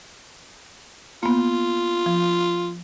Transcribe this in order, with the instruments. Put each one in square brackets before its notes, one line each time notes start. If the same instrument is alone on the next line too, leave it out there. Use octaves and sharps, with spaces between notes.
[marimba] A#3 B3 [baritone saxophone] F4
[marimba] F3